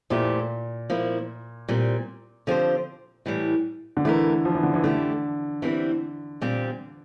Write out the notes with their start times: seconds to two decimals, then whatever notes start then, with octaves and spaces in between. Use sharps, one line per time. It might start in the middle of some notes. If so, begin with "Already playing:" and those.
0.10 A#2 F3 A3 E4 G4
0.90 F3 A#3 E4
1.69 A#2 G3 C4
2.47 D3 F3 C4 G4 C5
3.26 A2 E3 G3
3.97 D3
4.05 E3 A3 E4 A#4
4.45 F3
4.55 E3
4.63 D3
4.74 E3
4.84 D3 A3 E4 G4
5.62 E3 G3 C4 E4
6.41 A#2 G3 C4 G4